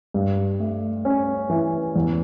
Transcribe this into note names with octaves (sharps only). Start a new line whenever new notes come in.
G2
A3
C#4
E3
E2